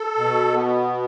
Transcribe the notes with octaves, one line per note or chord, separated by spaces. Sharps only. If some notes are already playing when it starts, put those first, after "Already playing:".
Already playing: A4
B2
B3